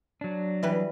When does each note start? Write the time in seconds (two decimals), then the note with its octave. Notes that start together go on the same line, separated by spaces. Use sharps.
0.21 F#3 D4
0.63 E3 G3 B4